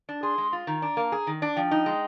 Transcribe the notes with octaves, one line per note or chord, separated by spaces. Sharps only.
D4
G#4 C6
G#3
F4
D#3 A#5
D4
A#3
G#4
D#3
D4
F3 G5
D#4
G#3